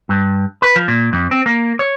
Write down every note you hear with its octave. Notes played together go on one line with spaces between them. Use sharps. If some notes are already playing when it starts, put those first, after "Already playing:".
G2
B4
F3
A#2
F2
C4
A#3
C#5